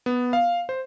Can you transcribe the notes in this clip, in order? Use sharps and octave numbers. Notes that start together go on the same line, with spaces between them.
B3
F5
C5